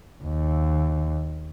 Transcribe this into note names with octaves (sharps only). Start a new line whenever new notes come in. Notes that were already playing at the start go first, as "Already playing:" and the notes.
D#2